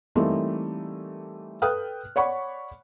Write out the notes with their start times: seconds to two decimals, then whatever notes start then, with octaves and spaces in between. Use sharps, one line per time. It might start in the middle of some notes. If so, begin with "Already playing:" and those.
0.15 E3 G3 A3 A#3 C4 D#4
1.62 A4 B4 G5 D#6 F6 F#6
2.16 C#5 D5 F#5 B5 C#6